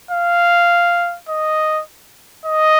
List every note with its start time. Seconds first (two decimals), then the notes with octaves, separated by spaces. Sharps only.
0.11 F5
1.28 D#5
2.45 D#5